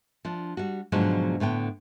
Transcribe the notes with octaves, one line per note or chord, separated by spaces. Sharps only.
F3 D4
G3 F#4
G#2 B2 D3 F3 F#3 G#3
A2 D3 B3 G5